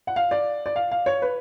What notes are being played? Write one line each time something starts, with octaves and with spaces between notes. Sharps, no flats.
F#5
F5
D5
D5
F5
F5
C#5
B4